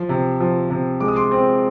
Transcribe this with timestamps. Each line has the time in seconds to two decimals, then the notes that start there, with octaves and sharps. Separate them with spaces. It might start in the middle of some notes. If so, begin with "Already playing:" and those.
Already playing: F3
0.09 C3
0.40 F3
0.70 C3
1.00 G#3 D6
1.08 D#6
1.16 C6 D6
1.31 C4